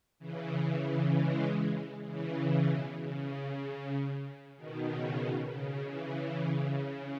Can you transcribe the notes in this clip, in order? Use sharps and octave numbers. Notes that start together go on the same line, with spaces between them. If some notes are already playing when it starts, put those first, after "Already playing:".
C#3 E3
E3 G#3
C#3 E3
C#3
B2
C#3
B2 D#3
C#3
B2
C#3
C#3 E3
C#3 E3
C#3